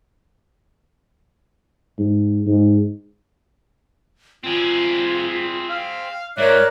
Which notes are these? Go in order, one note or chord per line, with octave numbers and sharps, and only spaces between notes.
G#2
G#2
C4 F4 G#4
F5
G#2 A#4 C#5 D5 E5 F#6